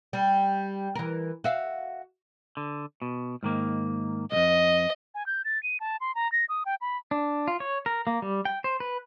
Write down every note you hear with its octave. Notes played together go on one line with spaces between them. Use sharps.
G3
E3 A#4
F#4 E5 F5
D3
B2
G#2 D#3 A#3
C2 F2 D#5
G#5
G6
A6
D#7
A5
C6
A#5
A#6
D#6
G5
B5
D4
F4
C#5
A#4
A#3
G3
G5
C5
B4